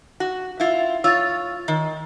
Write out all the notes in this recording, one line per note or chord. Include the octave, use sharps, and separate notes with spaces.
F#4
E4 F4
F4 C#5 E6 A6
D#3